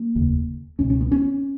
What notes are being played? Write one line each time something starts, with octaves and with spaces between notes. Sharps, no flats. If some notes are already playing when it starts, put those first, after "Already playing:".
Already playing: A#3
F1 D#2 C#3
C#2 B2 C#4
C#4
B3
C#4